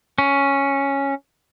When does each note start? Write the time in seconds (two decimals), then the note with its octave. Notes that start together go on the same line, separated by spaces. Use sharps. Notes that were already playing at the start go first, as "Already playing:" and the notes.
0.18 C#4